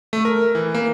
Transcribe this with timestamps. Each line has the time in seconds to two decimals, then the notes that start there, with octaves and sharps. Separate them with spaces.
0.13 A3
0.25 A#4
0.55 E3
0.75 A#3